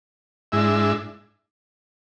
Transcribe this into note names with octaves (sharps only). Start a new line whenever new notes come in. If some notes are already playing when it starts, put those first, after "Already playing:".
G#2 G#3 D4 E4 E5